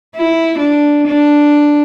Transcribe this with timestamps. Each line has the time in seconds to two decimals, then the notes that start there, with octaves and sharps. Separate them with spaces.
0.16 E4
0.59 D4
1.07 D4